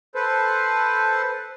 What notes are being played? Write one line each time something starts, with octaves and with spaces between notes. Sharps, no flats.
A4 B4 C5